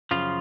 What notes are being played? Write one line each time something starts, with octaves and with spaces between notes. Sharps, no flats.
F#2 C#3 F3 F4